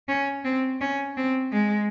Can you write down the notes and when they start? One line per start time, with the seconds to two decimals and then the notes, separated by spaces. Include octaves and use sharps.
0.08 C#4
0.44 C4
0.81 C#4
1.17 C4
1.52 G#3